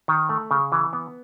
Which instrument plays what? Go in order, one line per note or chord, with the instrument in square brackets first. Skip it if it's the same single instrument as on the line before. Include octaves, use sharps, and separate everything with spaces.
[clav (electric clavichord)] D#3
A3
C#3
E3
B3